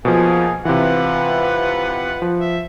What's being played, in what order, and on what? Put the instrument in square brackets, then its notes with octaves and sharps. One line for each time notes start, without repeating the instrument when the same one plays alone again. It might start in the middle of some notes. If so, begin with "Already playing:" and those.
[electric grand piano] B2 F3 [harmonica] A#3 G#4
[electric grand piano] C3 E3 [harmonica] F4 B4 F#5
[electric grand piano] F3
[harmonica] E5